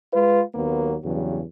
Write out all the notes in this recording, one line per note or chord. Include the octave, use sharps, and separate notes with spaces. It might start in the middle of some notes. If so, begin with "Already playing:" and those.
G#3 F4 B4
D#2 F#3 A#3 B3
E2 G2 C#3 F#3